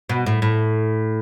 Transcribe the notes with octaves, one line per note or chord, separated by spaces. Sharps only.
B2
A2
A2